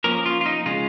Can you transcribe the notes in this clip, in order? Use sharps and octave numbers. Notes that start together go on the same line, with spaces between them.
F3 A#3 C#4 A#4
F4
F4
D#4
C#3 G#3 C#4 F4